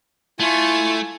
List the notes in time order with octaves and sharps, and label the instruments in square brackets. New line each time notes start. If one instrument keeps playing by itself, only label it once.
[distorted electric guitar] A3 [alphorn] E4 [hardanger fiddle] F4 C#6 [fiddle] G#5